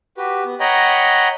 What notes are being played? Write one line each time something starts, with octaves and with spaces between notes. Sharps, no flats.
F#4 G4 B4
B3
C#5 D#5 F#5 G5 A#5 B5